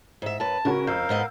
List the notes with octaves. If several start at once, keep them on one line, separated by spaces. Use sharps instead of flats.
G#2 E5
F#2 B4 A5
C#3 C#4 F#4 A#4
F2 A#4 F5 E6 G6
G#2 B3 D#5